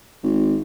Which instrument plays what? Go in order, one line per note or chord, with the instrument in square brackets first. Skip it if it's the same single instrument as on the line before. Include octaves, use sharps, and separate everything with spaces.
[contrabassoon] G#1